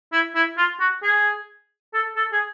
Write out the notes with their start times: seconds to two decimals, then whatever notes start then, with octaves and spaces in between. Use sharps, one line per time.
0.12 E4
0.35 E4
0.57 F4
0.80 F#4
1.03 G#4
1.94 A4
2.16 A4
2.32 G#4